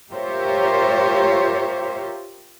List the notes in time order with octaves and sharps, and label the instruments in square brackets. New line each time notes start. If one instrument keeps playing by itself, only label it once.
[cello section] F4 G4 A#4 C5 C#5 E5